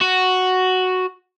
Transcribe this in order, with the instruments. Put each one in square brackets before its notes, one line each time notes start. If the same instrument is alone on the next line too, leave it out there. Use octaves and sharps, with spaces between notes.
[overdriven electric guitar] F#4